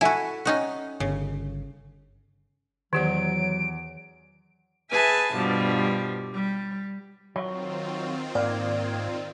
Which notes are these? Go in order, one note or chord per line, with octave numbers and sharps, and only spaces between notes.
E4 F#4 A4 E5 G#5
C#4 D#4 F#4
G1 C#3
E2 D#3 F#3 G4 D5 D7
G#4 B4 E5 G#5 A5
G2 B2 F3 G3
G3
D#3 F#3 C4 F4
G#2 A#3 D5